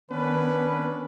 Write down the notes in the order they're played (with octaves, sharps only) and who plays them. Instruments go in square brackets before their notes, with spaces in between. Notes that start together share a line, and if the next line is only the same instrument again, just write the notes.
[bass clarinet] D#3 [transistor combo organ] B3 [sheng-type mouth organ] C#4 D4 [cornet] B4